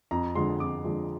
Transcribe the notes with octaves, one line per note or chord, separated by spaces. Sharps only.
F2 A#5
D3 F3 G#3 C6
F2 D6
D3 F3 G#3